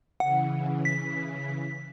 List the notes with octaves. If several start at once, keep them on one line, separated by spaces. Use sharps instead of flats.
C#3 E3 F#5
B6